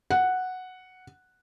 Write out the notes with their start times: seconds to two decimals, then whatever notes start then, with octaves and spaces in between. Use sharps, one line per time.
0.11 F#5